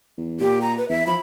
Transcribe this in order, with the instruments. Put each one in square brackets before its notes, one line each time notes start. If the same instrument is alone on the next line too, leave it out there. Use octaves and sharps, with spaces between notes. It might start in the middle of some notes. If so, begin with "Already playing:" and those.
[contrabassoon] E2
[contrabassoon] A#2 [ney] G4
[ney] A#5
B4
[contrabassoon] E2 [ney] E5
[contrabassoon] F3 [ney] B5